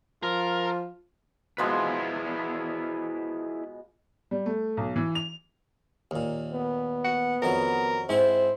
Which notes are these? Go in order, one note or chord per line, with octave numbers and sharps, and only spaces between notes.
F3 F4 A#4
B2 F3 G#3 E4 G#4 B4
G3
A3
B1
E3
F7
D#2 A#2
B3
F#5
F2 D#3 F#3 A#4
G#2 C4 E4 C5